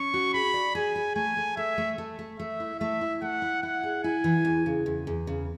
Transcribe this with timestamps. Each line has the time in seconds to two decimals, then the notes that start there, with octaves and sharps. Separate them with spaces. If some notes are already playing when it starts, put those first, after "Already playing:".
Already playing: C#4 C#6
0.14 F#4
0.34 G#4 B5
0.54 D5
0.75 G#4 G#5
0.96 G#4
1.16 A3 G#5
1.37 A3
1.57 A3 E5
1.78 A3
1.98 A3
2.19 A3
2.39 A3 E5
2.60 E4
2.80 A3 E5
3.01 E4
3.22 A3 F#5
3.42 E4
3.63 E4 F#5
3.84 G#4
4.04 E4 G#5
4.24 E3
4.45 E2
4.66 C#3
4.86 E2
5.07 E2
5.27 C#3